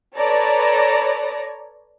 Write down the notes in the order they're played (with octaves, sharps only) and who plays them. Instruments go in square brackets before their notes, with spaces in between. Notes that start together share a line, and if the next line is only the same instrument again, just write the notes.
[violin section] A4 B4 C#5 D5 A#5 A#6